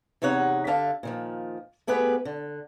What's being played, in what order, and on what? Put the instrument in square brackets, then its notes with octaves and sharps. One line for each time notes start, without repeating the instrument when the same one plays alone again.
[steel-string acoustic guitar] E2 C3 D#4 C#5 F#5
D3 E5 F5 A5
A#2 D#3 F3
A3 B3 G4 G#4 B4
D3